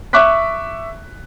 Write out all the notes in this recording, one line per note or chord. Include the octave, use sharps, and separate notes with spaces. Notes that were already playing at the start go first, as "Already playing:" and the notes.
E5 C#6 D6 F#6 B6